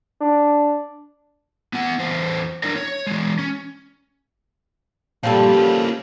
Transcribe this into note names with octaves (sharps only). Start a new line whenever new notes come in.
D4
B3 E4 F#5
E2 E3 C5
D4 E4 A#4 D5
C#5
E3 G#3
C#4
G2 A#2 F3 G3 A4
A#3 C#4